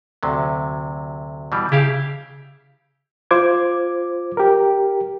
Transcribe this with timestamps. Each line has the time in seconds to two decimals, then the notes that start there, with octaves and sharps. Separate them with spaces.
0.23 D2 C3 F#3
1.52 B2 E3 G3
1.72 C#3 E4 G4 F5
3.31 F4 C5 D6 G#6
4.37 G4 A#4